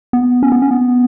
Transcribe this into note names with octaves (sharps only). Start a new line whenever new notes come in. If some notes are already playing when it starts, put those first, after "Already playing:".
B3
C#4
B3
C#4
B3